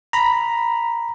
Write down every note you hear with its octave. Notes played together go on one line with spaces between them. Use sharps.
A#5 B5